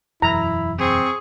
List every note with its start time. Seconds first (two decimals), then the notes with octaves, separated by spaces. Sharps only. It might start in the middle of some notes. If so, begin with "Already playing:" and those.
0.22 E1 F#2 E3 E4 A#5
0.78 C4 G#4 C#6